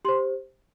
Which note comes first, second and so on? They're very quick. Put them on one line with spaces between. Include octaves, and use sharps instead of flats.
G4 C6 C5